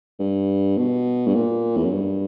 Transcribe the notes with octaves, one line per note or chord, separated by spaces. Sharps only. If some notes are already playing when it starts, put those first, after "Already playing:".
G2
B2
G2
A#2
E2
F#2
G2